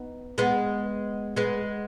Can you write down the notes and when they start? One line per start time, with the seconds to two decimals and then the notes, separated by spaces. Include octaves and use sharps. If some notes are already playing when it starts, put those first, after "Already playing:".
Already playing: B3 D#4
0.38 G#3 B3
1.36 G#3 B3